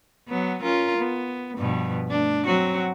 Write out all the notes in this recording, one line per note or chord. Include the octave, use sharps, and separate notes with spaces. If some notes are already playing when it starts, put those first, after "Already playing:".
F#3 B3
C#4 F4 A#4
B3
G2 B2 F3
A3 D4
F#3 C4 F#4